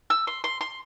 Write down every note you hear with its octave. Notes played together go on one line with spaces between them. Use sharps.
E6
C6
C6
C6